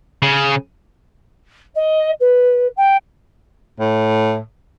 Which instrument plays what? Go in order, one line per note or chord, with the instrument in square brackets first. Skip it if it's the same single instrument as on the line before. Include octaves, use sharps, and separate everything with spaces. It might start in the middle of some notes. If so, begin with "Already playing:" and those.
[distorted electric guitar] C#3
[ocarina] D#5
B4
G5
[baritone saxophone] A2